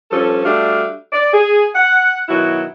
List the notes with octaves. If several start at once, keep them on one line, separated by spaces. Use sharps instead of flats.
G2 F3 C#4 A4
G3 A3 D4 F#4 E5 F5
D5
G#4
F#5
B2 D#3 F#3 E4 F#4